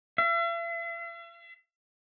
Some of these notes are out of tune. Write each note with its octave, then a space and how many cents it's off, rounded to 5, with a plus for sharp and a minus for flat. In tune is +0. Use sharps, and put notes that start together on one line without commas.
E5 +45